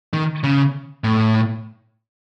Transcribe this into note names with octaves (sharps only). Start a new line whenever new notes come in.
D#3
C#3
A2